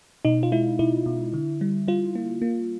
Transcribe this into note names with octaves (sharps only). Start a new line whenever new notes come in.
B2 D#4
F4
G#3 E4
B2 E4
B2
D3
G3
G3 F4
A#3
A#3